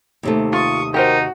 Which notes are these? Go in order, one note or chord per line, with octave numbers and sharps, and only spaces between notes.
D#2 C3 A3
F4 C#6 D#6
D#4 F#4 G4 A#4 C5